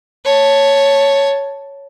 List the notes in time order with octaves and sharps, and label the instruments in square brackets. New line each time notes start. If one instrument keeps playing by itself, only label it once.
[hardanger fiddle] C#5 A5